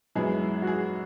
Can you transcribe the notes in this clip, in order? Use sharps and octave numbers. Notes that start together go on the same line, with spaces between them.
F#2 E3 G#3 B3 E4 G#4
F#4
G#4